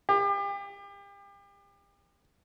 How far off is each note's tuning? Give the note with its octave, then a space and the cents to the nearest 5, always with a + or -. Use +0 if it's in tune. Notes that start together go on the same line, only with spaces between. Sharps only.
G4 +35